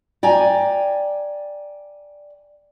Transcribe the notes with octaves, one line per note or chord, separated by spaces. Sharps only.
D5 G5 G#5 A#5